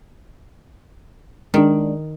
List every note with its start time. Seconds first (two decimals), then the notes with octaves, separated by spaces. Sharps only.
1.54 D#3 G#3 D4